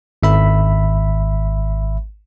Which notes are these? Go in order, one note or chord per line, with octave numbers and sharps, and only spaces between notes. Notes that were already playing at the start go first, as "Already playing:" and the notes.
G#1 E5 B5